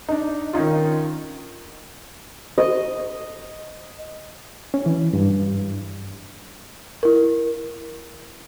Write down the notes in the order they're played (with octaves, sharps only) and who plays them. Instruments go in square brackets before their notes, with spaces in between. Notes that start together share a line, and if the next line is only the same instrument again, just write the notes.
[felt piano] D4 D#4
D#3 C#4 D#4 F4
[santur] D#5
[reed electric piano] C#4
E3
G2
[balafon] E4 A#4